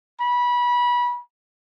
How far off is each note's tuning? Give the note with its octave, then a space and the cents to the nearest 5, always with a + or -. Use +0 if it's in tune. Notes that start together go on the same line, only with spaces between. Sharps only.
B5 -25